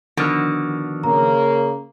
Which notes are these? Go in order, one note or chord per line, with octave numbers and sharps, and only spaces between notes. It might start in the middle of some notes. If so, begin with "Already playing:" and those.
B2 D3 D#3 F3 F6
C#3 A#3 A#5